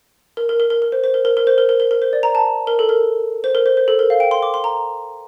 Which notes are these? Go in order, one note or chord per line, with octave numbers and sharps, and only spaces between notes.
A#4
A#4
A#4
A#4
A#4
C5
C5
A#4
A#4
A#4
C5
A#4
A#4
A#4
A#4
C5
D5
A#5
A5
A#4
A4
A#4
C5
A#4
C5
C5
A4
A#4
F5
G5
C6
D6
C6
A#5